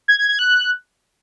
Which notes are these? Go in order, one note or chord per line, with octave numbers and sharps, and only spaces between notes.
G#6
G#6
G#6
F#6